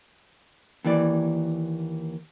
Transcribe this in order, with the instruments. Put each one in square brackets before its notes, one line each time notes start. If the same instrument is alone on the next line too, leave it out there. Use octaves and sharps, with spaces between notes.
[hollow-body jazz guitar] D#2 E3 D5